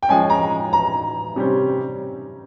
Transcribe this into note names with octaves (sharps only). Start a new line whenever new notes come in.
G5
F3 G#3 C#4 G#5
A#5
A#5
C3 G3 C#4 G4 C5